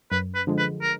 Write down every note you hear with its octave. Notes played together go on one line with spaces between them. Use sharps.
F#2 B4
B4
D3 F3 G#3
B4
A#4